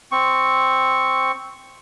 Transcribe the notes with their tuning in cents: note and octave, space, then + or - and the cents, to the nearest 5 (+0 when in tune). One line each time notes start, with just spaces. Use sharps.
C4 +0 C#6 +0